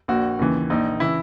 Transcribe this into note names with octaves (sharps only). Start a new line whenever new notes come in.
A#1 A#2 F#4
D#2 C#3 E3
A#1 A#2 D#4
C#3 E3 E4